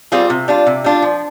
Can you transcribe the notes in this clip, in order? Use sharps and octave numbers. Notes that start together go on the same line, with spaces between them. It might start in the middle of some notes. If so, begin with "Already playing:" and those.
G3 C4 F4 G#4
C3
G3 D4 F4
C3
G3 D4 F4
F3